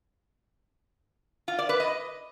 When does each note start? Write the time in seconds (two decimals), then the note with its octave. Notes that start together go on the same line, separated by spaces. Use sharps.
1.48 F4
1.59 D5
1.69 B4
1.80 D#5